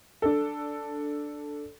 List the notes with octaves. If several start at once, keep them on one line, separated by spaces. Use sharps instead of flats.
D4 A4